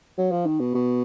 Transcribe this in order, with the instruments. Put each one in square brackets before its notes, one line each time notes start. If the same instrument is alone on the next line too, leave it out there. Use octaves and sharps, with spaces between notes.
[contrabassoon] F#3
F3
D#3
B2
B2